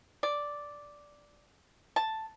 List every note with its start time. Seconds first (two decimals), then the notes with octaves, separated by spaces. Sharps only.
0.23 D5
1.96 A5